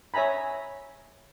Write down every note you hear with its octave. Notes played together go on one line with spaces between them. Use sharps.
C#5 E5 G#5 A#5 B5